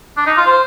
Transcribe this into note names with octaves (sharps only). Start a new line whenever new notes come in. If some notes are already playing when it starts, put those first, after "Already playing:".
D4
D#4
F4
C5